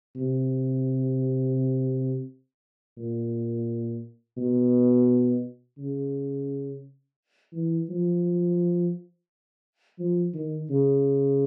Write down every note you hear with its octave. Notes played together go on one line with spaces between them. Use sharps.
C3
A#2
B2
C#3
E3
F3
F3
D#3
C#3